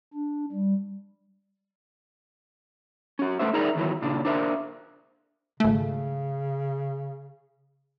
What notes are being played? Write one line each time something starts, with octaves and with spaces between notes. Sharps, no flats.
D4
G3
C#4 F#4
A3 B4 C5 E5
D#4 G#4 A#4 D5 E5 A#5
E2 D#3 E3 F#3
A#2 C#3 D4
D4 A#4 C5 E5
G#1 C#3 A3